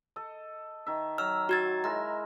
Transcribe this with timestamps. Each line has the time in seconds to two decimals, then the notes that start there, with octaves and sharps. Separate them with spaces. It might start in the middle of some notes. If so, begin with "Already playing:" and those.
0.16 A4 D#5
0.86 D#3 E5
1.18 F#3 E6 F6
1.49 F#4 G#6 A6
1.84 G#3 E4 A#4 A#5